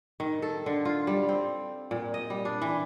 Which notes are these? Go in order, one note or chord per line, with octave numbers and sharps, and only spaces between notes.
D#3
A4
D3
F4
G3
C4
A#2
D#5
G3
D4
E3